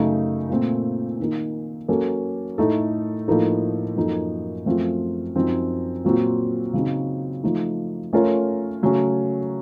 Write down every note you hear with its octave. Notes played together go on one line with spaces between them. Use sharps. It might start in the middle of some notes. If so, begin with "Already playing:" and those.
Already playing: F#2 C#3 A3 D#4
A#2 A3 C4
D#3 A#3 D#4
F#3 A#3 C#4 A4
A2 A3 D#4 A4
A2 F3 A#3 D#4 A4
F#2 F3 A#3 D#4 A4
F#2 F3 A3 C4 F4
F#2 F3 C4 D#4
A#2 F#3 C4 F4
C#3 F#3 C4 D#4
F3 A3 D#4
A3 C#4 F4 A#4 C#5
C#3 F#3 A3 C#4